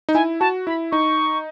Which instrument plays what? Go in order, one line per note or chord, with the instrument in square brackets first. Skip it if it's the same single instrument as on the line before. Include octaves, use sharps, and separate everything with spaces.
[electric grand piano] D#4
[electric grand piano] E4 [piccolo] G#5
[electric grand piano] F#4 [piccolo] A5
[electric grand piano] E4 [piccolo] B5
[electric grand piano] D#4 [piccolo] C#6